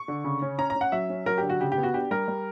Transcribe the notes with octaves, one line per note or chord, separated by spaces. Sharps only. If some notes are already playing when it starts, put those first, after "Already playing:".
Already playing: C#6
D3
C#3
C#4
C#4 A#5
A#5
C#4
F#5
F#3 E5
C#4
F#3 A#4
G4
D3
F#4
C#3 G4
G4
B3
F#4
D4 G4
G3 A#4
G3